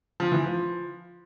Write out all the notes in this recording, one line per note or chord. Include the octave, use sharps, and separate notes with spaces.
F3
E3
F3